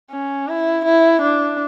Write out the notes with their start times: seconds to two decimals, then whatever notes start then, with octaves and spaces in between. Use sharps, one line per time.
0.11 C#4
0.48 E4
0.85 E4
1.22 D4